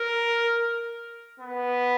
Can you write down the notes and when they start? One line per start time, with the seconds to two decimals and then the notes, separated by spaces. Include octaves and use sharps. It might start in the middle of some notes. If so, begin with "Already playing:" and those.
Already playing: A#4
1.40 B3